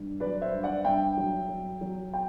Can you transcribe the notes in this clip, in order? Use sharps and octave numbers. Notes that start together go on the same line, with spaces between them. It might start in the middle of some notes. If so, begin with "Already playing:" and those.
Already playing: G2
F#3 B4 D5
C5 E5
G2
D5 F#5
G2 E5 G5
F#3
F#3
F#3
G5